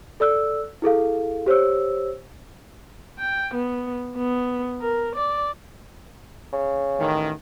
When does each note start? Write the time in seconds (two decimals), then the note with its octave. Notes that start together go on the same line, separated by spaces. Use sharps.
0.20 A4 D5 E6 F#6
0.82 E4 G#4 A4 F5
1.46 G4 C5 C#5 E6
3.19 G5
3.54 B3
4.17 B3
4.81 A#4
5.16 D5
6.53 C#3
6.99 A1 D#3